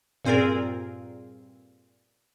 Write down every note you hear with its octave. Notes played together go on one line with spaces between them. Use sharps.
G2 A#2 C4 F4 G#4 A#4